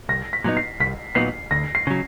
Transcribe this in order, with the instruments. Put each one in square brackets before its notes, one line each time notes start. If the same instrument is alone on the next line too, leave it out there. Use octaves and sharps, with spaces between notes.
[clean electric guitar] C2 [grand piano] A#6
[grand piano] B6
[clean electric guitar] A#2 F#3 B3 D#4
[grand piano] C7
[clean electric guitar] C2 [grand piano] B6
[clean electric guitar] A#2 F#3 B3 D#4 [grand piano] C7
[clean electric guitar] D2 [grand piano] A#6
[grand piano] C7
[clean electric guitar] C#3 F#3